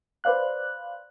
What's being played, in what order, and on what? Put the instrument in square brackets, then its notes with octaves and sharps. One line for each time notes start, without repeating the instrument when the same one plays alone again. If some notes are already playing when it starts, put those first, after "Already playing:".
[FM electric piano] B4 C5 D5 F5 F#6